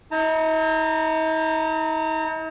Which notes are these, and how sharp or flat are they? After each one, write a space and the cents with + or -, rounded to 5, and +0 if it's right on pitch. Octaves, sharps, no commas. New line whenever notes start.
D#4 +45 A#5 -30